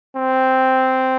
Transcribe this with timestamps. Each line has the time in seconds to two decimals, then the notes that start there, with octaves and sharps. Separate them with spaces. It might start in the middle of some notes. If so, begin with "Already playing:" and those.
0.16 C4